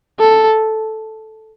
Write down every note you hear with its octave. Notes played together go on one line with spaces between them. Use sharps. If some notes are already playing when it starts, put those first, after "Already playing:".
A4